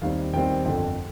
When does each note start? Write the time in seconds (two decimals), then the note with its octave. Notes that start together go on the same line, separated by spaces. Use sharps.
0.02 D#2 D#3 G3 C4 F5
0.33 D#2 D#3 G3 C4 G5
0.65 G1 F2 D3 G5